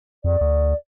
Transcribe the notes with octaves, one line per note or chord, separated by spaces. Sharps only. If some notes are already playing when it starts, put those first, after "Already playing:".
F2 D5
D2